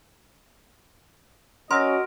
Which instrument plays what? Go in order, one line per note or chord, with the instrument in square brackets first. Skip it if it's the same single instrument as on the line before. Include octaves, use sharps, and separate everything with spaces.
[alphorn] C#4 [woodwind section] F#4 D#5 [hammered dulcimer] A#4 [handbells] C6 E6 A#6